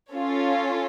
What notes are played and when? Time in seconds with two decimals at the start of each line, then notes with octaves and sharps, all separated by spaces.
0.15 C#4 F4 A4 C#5